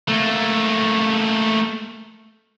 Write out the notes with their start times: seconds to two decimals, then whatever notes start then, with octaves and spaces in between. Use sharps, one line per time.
0.08 A3 A#3